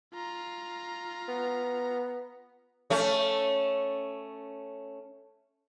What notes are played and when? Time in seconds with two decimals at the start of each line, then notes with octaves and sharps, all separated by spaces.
0.14 F4 A#5
1.28 B3
2.90 A3 C#4